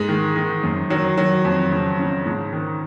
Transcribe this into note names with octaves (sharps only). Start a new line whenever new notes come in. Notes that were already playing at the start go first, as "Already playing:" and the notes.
Already playing: G#2 G#3
D#3
D#3
F#2
D#3 F#3
D#3 F#3
F2
C#3
C#3
G#2
D#3